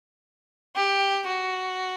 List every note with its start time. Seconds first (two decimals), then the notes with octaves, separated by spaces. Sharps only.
0.75 G4
1.26 F#4